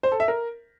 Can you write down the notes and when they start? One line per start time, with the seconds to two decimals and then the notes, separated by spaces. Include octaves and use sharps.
0.03 C5
0.12 A4
0.20 E5
0.28 A#4